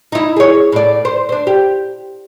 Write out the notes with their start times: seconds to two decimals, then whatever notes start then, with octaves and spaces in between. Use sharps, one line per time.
0.12 D#4 E4
0.37 G#4 C#5
0.72 A2 D5
1.05 C5
1.29 D4 C5
1.47 G4